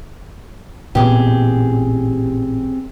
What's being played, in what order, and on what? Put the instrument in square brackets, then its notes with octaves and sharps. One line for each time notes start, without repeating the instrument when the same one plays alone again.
[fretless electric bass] A1 A#2 B3 [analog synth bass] C4 [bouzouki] G4 G#4